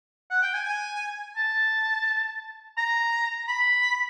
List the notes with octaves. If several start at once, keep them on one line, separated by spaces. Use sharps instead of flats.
F#5
G5
G#5
G#5
A5
A#5
B5